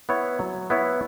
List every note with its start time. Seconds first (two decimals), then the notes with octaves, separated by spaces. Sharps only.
0.09 B3 E4 C#5
0.39 F#3
0.70 B3 E4 C#5